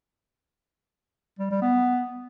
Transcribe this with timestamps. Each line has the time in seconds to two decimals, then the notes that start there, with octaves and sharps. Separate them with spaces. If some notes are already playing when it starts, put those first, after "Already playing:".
1.39 G3
1.51 G3
1.62 B3